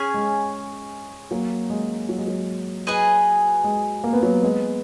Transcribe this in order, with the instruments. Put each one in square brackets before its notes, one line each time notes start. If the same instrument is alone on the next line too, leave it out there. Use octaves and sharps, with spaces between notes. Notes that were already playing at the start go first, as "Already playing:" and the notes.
Already playing: [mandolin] C#4 G#4 G#5
[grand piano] G#3
F#3 A#3
G#3
F#3
G#3
F#3
[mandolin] G#4 B4 D#5 G#5
[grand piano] G#3
A#3
B3
F#3 A#3
G#3 B3